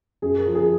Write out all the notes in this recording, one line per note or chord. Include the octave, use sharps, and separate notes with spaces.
F#2 G#4
A#4
F3
G#4